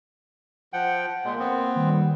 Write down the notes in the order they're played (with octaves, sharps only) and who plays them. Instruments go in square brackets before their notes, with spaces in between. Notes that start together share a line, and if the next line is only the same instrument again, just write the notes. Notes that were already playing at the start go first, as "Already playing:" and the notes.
[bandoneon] F3 F#5 G5
[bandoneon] A#2 G#3 [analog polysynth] A#3
[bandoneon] B3 C4
[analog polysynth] D#3 G3